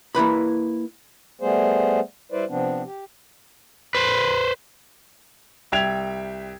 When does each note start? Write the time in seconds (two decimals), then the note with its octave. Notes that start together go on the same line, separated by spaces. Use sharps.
0.15 A#3 E4 B4 B5
1.41 G3 A3 B3 G#4 C5
2.32 G3 E4 B4 C5 D5
2.50 C3 F3 B3 C4 D4
2.85 G4
3.95 B4 C5
5.72 C2 E5 G5 G#6 F7